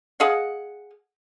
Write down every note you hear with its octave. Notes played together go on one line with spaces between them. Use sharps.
G#4 D#5 F5 F#5